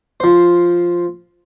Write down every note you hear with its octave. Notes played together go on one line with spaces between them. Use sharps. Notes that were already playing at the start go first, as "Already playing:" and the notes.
F3 C5